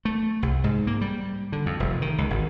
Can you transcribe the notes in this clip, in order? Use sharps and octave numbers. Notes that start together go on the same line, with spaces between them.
A3
C2
G#2
A#3
G3
D3
F2
F1
D#3
C#2
G#1